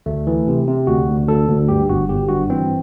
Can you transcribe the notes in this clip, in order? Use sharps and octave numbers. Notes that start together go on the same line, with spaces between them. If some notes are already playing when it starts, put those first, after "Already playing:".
D2 A3
E3
C3
C3
D2 F#4
D2
D2 A4
D2
G2 G4
G1 F#4
G1 G4
G2 F#4
E3 C4